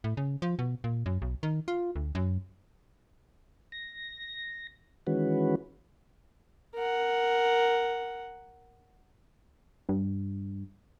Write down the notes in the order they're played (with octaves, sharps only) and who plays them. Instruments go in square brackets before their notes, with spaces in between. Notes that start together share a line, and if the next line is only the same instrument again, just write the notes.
[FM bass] A2
C#3
F3
B2
A#2
F#2
B1
D#3
F4
D2
F#2
[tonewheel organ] A#6
D#3 E3 G#3 C#4 F#4 B4
[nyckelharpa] A#4 F#5
[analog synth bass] G2